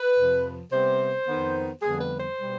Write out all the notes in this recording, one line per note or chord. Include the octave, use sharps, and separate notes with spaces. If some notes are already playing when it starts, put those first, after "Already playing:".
Already playing: B4
F2 C3 F3
C3 G3 B3 C5
F2 D#3 B3
F2 D3 G3 B3 G#4
B4
C5
B2 G3 B3